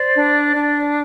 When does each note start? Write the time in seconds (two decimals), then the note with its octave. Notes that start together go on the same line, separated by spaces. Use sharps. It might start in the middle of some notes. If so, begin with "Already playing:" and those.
Already playing: C5 D5
0.15 D4
0.55 D4